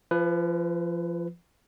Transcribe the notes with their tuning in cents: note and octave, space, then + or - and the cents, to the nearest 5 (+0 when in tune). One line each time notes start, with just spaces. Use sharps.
F3 -25 B4 +15